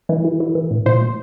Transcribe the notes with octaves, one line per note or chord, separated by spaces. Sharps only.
E3
E3
E3
E3
A2
A#2 C5
A#2